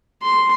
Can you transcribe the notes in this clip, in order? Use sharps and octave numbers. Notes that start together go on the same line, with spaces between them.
C6